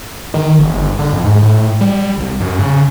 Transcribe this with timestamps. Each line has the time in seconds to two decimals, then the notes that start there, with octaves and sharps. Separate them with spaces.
0.34 D#3
0.59 F#1
0.72 G1
0.99 D3
1.13 F2
1.24 G#2
1.43 A2
1.81 G3
2.18 C2
2.41 F#2
2.59 C#3